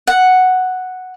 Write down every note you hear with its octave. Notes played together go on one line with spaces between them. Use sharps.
F#5